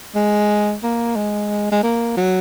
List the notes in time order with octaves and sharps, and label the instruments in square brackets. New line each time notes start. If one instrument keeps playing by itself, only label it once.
[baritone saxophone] G#3
A#3
G#3
G#3
A#3
F#3